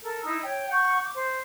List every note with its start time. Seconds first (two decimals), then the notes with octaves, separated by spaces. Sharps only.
0.02 A4 A#4
0.23 D#4 E4 D#6 E6
0.43 C#5 G5
0.70 F#5 C#6 G6
1.00 D6
1.15 C5